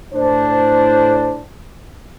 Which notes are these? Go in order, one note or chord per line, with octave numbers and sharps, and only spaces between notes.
A2 D4 C5